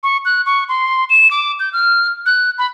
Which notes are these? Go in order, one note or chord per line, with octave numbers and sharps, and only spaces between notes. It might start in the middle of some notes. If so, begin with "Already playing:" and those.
C#6
F#6
C#6
C6
E7
D6
G6
F6
F#6
B5